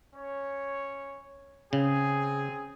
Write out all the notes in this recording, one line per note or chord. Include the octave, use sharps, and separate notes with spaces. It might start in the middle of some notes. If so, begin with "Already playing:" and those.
C#4 C#5
C#3 C4 G#4